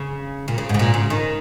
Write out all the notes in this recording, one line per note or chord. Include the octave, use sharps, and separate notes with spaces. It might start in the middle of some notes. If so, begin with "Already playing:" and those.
Already playing: C#3
A#2
C#3
G#2 C#3
A#2
C#3
D#3